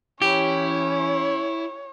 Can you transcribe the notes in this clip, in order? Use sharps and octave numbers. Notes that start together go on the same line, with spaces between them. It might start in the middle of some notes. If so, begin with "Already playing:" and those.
E3 C#4 E4 G4 C#5